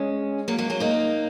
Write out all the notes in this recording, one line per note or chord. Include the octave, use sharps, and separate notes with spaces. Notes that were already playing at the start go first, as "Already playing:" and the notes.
Already playing: G#3 C#4
F#3 A#3
F#3 A#3
F#3 A#3
A#3 D#4